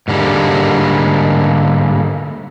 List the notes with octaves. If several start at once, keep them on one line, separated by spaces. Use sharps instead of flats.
G#2 D3 G3 G#3 A#3